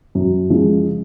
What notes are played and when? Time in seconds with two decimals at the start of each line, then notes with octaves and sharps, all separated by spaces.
0.15 F#2
0.50 C#3 F3 G#3